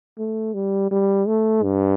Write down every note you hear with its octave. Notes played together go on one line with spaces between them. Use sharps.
A3
G3
G3
A3
G2